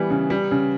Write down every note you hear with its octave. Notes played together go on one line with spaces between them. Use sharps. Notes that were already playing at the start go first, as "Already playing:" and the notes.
Already playing: E3 G3 B3
C#3
G3
C#3